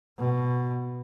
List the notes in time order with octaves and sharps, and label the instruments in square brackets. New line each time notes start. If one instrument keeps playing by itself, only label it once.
[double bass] B2